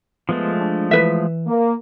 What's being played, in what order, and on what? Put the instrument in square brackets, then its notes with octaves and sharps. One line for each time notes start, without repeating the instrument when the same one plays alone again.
[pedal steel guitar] F3 G#3 A3 [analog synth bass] B3
[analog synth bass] D4
[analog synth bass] E3 [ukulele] B4 E5
[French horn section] A#3